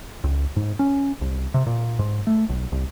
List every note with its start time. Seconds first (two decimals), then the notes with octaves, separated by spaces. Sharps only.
0.24 C#2
0.56 G#2
0.79 C#4
1.21 C2
1.54 C3
1.66 A#2
1.99 G#2
2.27 A3
2.49 B1
2.72 C2